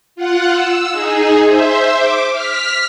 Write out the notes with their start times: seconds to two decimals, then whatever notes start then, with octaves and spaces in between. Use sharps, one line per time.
0.16 F4 F#5
0.51 E6
0.90 D#4 G#4
1.43 C5 E5
1.97 D6
2.31 F6 B6